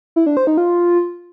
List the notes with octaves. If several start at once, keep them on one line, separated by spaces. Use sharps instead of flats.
E4
D4
C5
D#4
F4